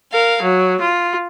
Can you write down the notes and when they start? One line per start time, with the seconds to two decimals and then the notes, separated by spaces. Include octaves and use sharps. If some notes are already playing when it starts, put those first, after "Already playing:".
0.11 A#4 F5
0.43 F#3
0.80 F4